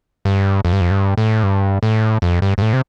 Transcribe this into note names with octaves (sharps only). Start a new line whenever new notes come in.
G2
F2
G2
F2
G2
A2
G2
A2
F2
G2
G2
A2
C3